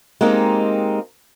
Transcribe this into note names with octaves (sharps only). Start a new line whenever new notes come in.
G#3 A#3 C4 D#4 G4